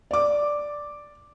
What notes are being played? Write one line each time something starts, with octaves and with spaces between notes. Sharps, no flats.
D5 D6